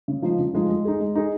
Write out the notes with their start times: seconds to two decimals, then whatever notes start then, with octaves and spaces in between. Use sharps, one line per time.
0.08 C#3
0.22 F3 G#3 D#4
0.39 C#3
0.54 F3 G#3 D#4
0.69 G#3
0.85 D#4 G#4
1.00 G#3
1.15 D#4 G#4